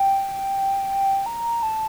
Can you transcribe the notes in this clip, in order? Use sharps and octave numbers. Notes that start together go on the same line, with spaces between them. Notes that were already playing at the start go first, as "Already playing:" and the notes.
Already playing: G5
A#5
A5